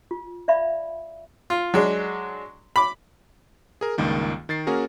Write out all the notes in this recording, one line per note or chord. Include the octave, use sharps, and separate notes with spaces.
F4
D5 E5 F5 B5
F4
F#3 G#3 D4
B5 D6
G#4 A#4
C#2 G2 D#3 A#3
D#3 A6 C7
A#3 C#4 F#4 G#4 A#4